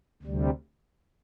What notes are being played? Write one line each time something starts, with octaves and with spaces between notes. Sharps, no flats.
D2 C3 G3